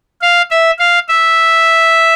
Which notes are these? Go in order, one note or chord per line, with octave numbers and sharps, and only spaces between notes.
F5
E5
F5
E5